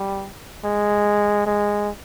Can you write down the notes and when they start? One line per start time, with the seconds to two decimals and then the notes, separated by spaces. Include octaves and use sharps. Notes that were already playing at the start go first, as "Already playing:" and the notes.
Already playing: G3
0.64 G#3
1.46 G#3